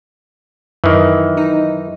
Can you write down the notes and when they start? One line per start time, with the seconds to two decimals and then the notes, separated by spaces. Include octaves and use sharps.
0.84 F#2 D#3 E3
1.37 D#4